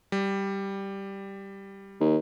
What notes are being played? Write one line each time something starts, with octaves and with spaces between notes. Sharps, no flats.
G3
D#2